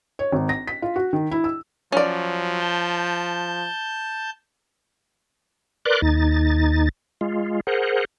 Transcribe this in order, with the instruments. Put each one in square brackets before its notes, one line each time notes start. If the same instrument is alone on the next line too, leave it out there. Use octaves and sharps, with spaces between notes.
[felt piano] C#5
G#1
A#6
B6
F4
F#4
D#3
E4
E6
[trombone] F3 [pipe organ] F#3 [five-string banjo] C#4 D5
[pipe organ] A5 G6
[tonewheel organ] A#4 B4 D5 C6 D6 F#6
D#2 D#4 A6
G#3 F4
G#4 A#4 C5 F#5